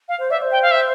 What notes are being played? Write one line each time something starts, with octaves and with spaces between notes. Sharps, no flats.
F5
C5
D5 E5
C5
G5
F5
E5